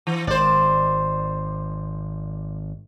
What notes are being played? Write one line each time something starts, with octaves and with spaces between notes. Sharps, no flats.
E3
G#1 C5 D5